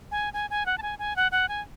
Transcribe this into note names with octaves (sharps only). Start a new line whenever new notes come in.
G#5
G#5
G#5
F#5
A5
G#5
G#5
F#5
F#5
G#5